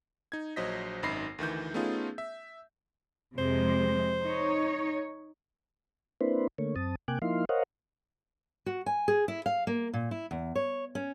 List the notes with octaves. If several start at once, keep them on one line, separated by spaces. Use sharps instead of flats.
D#4 G#6
A#1 F#3 C5 D#5 A#6 B6
G#1 F#2 D#4 B5 A#6 C7
D2 D#3 E3 G6
A3 B3 C#4 D#4 F4 G#4
E5
F2 C3 G#3 C5
D#4 C#5
A#3 C4 D4 E4 B4 C5
D3 A3 A#3 C#5
F#2 C4 A5 D#6
C3 A#3 G5 G#5 D6 F#6
F3 A#3 D#4 E4 F5 C6
A#4 C5 C#5 D#5 F5 F#5
F#4
G#5
G#4
E4
F5
A#3
A#2
E4
E2
C#5
C#4